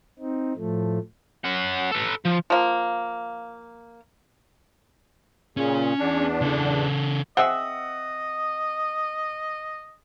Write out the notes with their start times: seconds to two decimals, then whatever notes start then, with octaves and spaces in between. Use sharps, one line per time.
0.19 C4 D#4
0.56 A2 F3 A3
1.45 C#4 F#5
1.92 A4 B4
2.25 F3
2.50 F3 A#3
5.57 A#2 C#3 C#4
5.99 E2 D4
6.41 C#3 A4
7.37 C4 G#4 D#5 E5 F#5